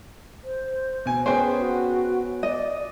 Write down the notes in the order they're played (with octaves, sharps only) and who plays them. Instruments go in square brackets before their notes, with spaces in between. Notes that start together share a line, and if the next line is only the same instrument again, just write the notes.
[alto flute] C5
[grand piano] B2 G#5
[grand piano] B3 G5 G#5 [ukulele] C#4 D4 C5 [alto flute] G#4
[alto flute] F#4
[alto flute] D5 [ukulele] D#5